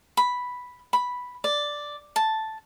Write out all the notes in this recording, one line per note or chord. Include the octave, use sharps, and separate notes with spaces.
B5
B5
D5
A5